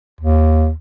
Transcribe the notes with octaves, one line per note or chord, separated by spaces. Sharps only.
D#2